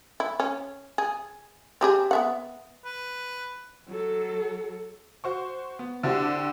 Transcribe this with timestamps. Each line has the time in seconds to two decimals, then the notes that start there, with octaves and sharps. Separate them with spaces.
0.20 E4
0.40 C#4
0.98 G#4
1.81 C4 G4 G#4
2.11 B3 E5 F#5
2.85 B4
3.88 F#3 A4
5.24 F#4 C5 C#6
5.79 B3
6.03 D3 C4 D4 E4 F#4 G4